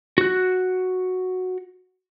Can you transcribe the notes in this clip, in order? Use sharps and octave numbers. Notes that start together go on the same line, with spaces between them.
F#4 F#6